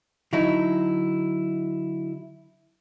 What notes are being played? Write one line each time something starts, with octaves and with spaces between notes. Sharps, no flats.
D3 F#3 D#4 E4